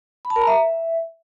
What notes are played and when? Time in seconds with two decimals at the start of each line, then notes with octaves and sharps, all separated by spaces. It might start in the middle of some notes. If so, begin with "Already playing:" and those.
0.25 B5
0.30 A5
0.36 A#4
0.42 A#5
0.47 E5